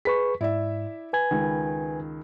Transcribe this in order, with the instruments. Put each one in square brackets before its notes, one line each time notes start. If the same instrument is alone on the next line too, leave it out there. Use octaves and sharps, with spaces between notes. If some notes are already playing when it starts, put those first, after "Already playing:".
[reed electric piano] G#4 B4 C#6 [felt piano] B6
[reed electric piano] G#2 [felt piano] E4 D5 E5
[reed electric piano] B4 G#5 G#6
[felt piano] C#2 D#3